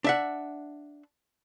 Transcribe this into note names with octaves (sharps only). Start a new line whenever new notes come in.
D4 E5 F#5